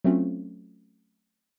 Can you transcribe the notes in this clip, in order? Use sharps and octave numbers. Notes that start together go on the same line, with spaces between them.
F#3 A3 C4 C#4 F4